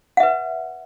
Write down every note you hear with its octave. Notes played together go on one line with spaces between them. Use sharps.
B4 E5 F#5